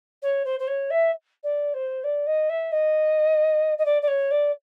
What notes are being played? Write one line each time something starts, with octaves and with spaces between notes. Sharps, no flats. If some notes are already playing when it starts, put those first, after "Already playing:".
C#5
C5
C5
C#5
E5
D5
C5
D5
D#5
E5
D#5
D#5
D5
D5
C#5
D5